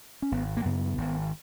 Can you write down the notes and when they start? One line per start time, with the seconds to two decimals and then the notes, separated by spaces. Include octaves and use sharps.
0.22 C#4
0.32 G#1 B3
0.57 A#3
0.65 F#2 C#3 B3
0.98 G#1